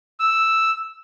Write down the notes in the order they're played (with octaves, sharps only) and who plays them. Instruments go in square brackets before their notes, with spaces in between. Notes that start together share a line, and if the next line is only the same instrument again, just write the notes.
[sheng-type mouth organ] E6